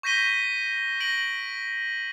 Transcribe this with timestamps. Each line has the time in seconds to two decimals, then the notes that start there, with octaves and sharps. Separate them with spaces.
0.03 C#6 G6 A#6 B6 D#7 G7
1.00 A#6 D7 F#7